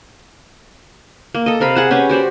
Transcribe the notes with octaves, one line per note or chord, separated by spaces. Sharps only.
A#3
A4 D#5
C3 A#4 F5 B5
G#4 F#5 A5
C#4 G4 G#4 B4
F#4 G4 C5 D5